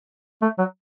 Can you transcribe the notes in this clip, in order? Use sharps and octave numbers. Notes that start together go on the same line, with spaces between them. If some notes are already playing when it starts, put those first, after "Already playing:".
A3
F#3